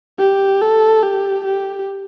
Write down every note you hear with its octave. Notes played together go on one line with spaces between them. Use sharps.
G4
A4
G4
G4